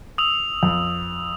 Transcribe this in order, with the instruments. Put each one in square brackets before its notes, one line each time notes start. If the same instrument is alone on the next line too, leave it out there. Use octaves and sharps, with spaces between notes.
[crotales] D#6 E6 F7
[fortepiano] F2 [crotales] F7